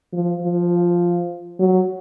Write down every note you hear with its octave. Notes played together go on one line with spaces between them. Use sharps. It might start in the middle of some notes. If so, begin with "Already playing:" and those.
F3
F3
F#3